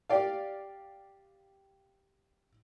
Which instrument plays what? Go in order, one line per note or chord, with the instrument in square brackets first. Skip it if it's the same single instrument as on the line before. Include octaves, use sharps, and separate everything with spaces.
[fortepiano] G4 D5 F5